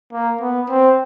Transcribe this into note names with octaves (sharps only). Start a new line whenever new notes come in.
A#3
B3
C4